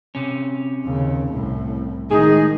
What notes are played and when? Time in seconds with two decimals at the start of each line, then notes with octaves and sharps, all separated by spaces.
0.15 C3 C#4
0.84 D#2 C#3
1.31 C2 A2
2.11 A2 D#3 G#3 D#4 G#4